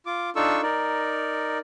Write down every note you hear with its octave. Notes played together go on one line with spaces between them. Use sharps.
F4 D6
D4 D#4 F4 A4 C#6 E6
D#4 A#4 D5